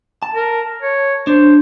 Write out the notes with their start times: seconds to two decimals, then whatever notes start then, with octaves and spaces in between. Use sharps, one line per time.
0.23 A5
0.34 A#4
0.82 C#5
1.27 D4 C5